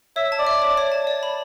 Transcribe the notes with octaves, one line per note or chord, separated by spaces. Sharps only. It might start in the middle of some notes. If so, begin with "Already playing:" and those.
C#5 E5
A5
D5
E5
C#5
C#5
A5
D5
B5